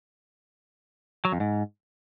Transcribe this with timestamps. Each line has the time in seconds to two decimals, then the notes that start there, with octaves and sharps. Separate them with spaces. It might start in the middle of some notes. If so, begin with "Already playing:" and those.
1.25 F#3
1.32 F2
1.40 G#2